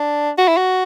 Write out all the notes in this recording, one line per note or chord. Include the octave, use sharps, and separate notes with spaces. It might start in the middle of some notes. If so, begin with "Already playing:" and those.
Already playing: D4
F#4
E4
F#4